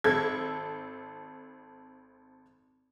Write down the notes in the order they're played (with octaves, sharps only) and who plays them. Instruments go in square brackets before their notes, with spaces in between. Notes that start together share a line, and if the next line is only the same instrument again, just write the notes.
[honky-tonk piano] G#1 A4 G#6